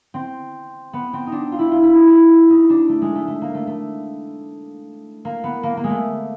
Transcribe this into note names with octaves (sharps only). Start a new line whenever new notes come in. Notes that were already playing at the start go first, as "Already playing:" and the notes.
C4
B3
C4
D#4
D4
F4
E4
F4
E4
D#4
E4
D#4
D4
A3
G#3
A3
A3
A#3
A3
A3
A#3
B3
A#3
A#3
G#3
A3